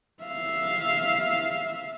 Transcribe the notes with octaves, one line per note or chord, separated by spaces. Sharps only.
E5 F5